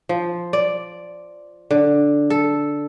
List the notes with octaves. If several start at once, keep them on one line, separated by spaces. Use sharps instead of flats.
F3
D5
D3
A4